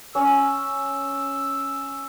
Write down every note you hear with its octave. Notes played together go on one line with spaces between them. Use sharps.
C#4 E6